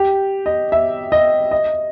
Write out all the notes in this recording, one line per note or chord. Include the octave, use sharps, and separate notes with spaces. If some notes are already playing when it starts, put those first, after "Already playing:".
Already playing: G4
D#5
E5
D#5
D#5